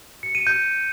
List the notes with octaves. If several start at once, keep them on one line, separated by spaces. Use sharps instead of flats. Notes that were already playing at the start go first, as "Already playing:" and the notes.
C#7
D#7
G6